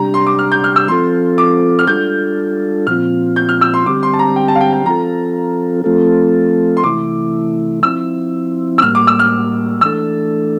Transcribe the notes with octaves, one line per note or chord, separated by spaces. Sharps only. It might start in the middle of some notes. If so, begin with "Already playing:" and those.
Already playing: C3 G3 D4 G4 A#5
C6
D6
F6
G6
F6
E6
F3 C4 F4 A4 C6
D6
F6
G3 D4 F4 A4 G6
A#2 F3 C4 F4 F6
G6
F6
E6
C6
D3 G3 C4 G4 D6
C6
A5
A#5
G5
A5
F5
G5
G5
F3 C4 F4 A4 A#5
F3 A3 C4 F4 A4
C6
C3 E3 A3 E4 D6
F3 C4 E4 E6
E6
A2 G3 A#3 F6
D6
E6
F6
E3 A3 D4 A4 E6